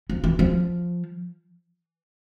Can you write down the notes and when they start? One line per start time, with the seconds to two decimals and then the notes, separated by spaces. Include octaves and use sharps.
0.10 F3
0.24 E3
0.39 F3